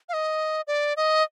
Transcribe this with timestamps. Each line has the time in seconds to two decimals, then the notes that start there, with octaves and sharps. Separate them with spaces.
0.09 F5
0.13 D#5
0.67 D5
0.97 D#5